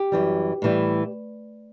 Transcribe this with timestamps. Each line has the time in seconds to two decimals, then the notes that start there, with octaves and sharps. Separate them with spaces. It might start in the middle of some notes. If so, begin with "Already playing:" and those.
Already playing: G4
0.12 F#2 E3 G3
0.62 A2 E3 G3